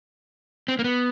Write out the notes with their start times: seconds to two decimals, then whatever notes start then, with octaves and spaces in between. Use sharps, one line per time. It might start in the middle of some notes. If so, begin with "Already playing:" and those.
0.68 C4
0.79 A#3
0.84 B3